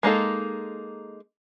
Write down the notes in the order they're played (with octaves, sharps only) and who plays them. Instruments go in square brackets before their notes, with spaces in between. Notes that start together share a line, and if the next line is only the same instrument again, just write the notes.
[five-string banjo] G#3 A#3 D#4 A4